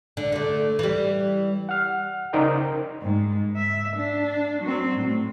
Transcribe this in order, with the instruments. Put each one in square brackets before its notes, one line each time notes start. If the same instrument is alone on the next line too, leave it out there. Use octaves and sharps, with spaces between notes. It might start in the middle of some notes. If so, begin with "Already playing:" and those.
[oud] D3
D3 A3
E3 G3
[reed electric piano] F#5 F6
C#3 D#4 A#4 C5 D5 G5
[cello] G#2
E5
D4
F#3 C4
A2